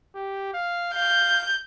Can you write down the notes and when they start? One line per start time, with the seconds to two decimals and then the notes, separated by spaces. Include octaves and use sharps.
0.15 G4
0.54 F5
0.94 F5 G6